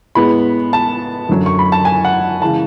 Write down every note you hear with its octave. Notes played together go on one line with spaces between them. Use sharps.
A2 G#3 B3 B5
A5
F#2 D3 F#3
C#6
B5
A5
G#5
F#5
C#3 E3 G#3 A5